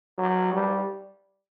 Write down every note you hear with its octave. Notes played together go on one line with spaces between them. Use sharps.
F#3
G3